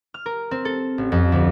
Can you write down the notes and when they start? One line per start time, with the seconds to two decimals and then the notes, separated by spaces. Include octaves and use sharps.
0.14 F6
0.26 A#4
0.51 C4
0.65 A4
0.98 A1
1.12 F2
1.32 D2